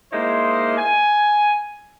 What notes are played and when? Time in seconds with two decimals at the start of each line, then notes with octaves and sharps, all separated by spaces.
0.12 G#3 A#3 D#4 E4 C5
0.78 G#5